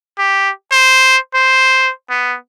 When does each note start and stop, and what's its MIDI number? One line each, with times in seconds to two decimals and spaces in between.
0.18 0.50 67
0.72 1.17 72
1.34 1.91 72
2.10 2.36 59